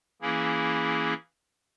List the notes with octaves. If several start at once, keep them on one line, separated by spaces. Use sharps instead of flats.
E3 A#3 C#4 E4 G#4